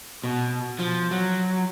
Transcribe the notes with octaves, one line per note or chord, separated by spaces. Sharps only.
B2
F3
F#3